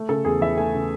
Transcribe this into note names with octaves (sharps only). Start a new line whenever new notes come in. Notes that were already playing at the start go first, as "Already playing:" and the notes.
Already playing: A3
C#3 A4
E2 G#4
E3 E5
A3 G#5
C#3